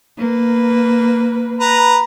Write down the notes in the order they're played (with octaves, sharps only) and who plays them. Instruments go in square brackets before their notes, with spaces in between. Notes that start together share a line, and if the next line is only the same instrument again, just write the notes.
[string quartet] A#3 B4
[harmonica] B4 A#5